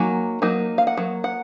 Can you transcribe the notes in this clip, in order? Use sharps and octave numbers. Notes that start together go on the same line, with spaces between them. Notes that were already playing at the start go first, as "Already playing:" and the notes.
Already playing: F#3 A#3 D#4 G#5
F#3 A#3 D#4
F5
F#5
F#3 A#3
F#5